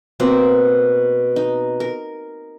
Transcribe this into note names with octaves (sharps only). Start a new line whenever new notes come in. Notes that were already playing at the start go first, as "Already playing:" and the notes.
B2 A#3 C4
D#4
A#4